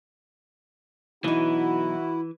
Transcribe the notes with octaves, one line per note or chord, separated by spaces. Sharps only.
B1 E3 D#4 E4 F#4